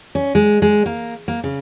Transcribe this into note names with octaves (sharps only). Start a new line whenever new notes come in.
C#4
G#3
G#3
A#3
A#3
C#3